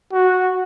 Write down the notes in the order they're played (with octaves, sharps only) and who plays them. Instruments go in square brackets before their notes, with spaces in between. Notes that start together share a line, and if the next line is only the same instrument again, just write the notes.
[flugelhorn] F#4